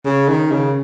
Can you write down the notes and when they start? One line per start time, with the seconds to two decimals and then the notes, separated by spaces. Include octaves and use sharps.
0.05 C#3
0.29 D#3
0.52 C#3